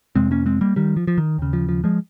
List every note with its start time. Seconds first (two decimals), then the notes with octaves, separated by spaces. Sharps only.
0.15 F2 C3 G#3 C4
0.31 A#3 C#4
0.46 G#3 C4
0.61 G3 A#3
0.76 D#3 G3
0.97 F3
1.07 F3
1.18 D#3
1.38 D#2 C#3
1.53 F3
1.69 F3
1.84 F3 G#3